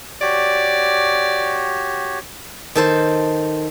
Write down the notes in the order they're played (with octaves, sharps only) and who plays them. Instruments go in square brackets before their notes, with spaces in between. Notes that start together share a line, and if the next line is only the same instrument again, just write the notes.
[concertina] F#4 G4 C#5 [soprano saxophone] D5
[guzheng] D#3 A4 C5